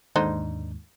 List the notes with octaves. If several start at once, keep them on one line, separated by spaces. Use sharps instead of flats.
D#2 G#2 D3 D#4 C5